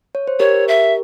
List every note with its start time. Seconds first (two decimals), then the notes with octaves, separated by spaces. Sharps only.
0.15 C#5
0.28 C5
0.40 G4 A#4 C#5
0.68 E5